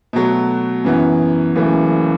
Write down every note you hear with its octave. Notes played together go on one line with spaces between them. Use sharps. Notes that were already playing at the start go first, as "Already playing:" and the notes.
B2 F#3 A3
F#2 E3 B3
F#1 F#2 E3 A3